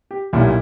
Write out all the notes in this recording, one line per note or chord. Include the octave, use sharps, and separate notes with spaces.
G4
B1 A#2 G3 E4